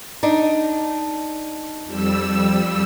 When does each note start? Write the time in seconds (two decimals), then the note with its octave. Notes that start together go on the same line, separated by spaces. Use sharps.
0.23 D4 D#4
1.85 F2 G3 E6